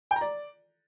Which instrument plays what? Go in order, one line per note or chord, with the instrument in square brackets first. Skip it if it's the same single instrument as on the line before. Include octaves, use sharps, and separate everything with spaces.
[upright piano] G5
A#5
D5